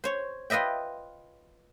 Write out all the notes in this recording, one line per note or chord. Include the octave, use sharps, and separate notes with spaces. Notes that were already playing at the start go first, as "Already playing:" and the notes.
C5 C#5
F4 B4 D#5 E5 G5